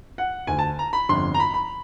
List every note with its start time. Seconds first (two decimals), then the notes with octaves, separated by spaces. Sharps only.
0.18 F#5
0.47 D2 D3 G#5
0.59 A5
0.79 A#5
0.93 B5
1.09 G1 F2 D3 C6
1.34 A#5
1.40 B5
1.54 B5